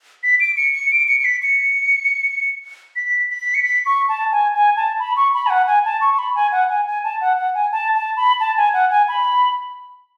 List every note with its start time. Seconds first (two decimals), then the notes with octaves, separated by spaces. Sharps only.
0.23 B6
0.40 D7
0.57 C#7
0.74 C#7
0.92 D7
1.08 C#7
1.20 C#7
1.25 B6
1.43 C#7
2.96 B6
3.30 B6
3.54 C#7
3.63 B6
3.86 C#6
4.09 A5
4.32 G#5
4.54 G#5
4.76 A5
5.00 B5
5.16 C#6
5.34 B5
5.47 G#5
5.50 F#5
5.67 G#5
5.85 A5
6.01 C#6
6.14 C#6
6.19 B5
6.35 G#5
6.52 F#5
6.69 G#5
6.87 G#5
7.04 A5
7.21 F#5
7.38 F#5
7.55 G#5
7.72 A5
7.95 A5
8.17 B5
8.40 A5
8.57 G#5
8.74 F#5
8.91 G#5
9.08 B5